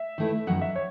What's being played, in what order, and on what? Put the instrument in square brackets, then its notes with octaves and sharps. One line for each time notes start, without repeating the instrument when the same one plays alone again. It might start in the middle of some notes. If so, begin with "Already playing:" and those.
Already playing: [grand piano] E5
[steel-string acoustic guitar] D#3 A3 E4 B4
[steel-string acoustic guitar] F#2 D#3 F#3 B3 [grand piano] F#5
[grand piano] E5
C#5